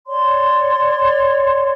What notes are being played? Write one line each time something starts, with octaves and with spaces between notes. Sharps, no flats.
C#5 D5 C6